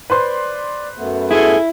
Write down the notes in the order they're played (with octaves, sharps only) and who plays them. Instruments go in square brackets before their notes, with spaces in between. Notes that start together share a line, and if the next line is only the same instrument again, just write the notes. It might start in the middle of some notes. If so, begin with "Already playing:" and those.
[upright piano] B4 C5 C6 [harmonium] D5
[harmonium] F#2 A3 B3
[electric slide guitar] E4 [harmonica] G#4 A4